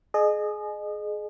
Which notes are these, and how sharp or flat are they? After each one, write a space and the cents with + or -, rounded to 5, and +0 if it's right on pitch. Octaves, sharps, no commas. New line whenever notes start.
G#4 +25 D#5 -30